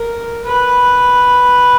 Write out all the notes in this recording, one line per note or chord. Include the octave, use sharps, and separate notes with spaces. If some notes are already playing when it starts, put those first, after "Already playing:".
Already playing: A#4
B4